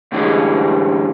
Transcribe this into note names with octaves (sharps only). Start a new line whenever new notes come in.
A2 D3 E3 F3 G3 G#3